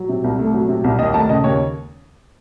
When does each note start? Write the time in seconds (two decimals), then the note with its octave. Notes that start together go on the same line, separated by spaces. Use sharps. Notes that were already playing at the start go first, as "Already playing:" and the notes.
Already playing: F#3
0.09 C3
0.24 C2
0.39 A3
0.54 F#3
0.69 C3
0.84 C2
0.99 D#2 D#5
1.14 A3 A5
1.29 C#3 D#5
1.44 D#2 C#5